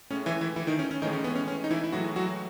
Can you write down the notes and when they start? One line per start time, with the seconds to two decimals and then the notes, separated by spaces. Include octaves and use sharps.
0.10 A2 G#3 C#4
0.26 E3 E4
0.41 E3 E4
0.56 E3 E4
0.67 D#3 D#4
0.79 C#4
0.91 C#4
1.02 A2 D#3 E3 G#3 D#4
1.13 C#4
1.24 B3
1.35 C#4
1.48 C#4
1.64 D#4
1.71 E3 E4
1.84 E4
1.92 A2 E3 F#3 G#3 F#4
2.16 F#3 F#4